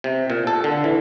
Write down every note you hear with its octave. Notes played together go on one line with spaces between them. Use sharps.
C3
A#2
A4
D3
E3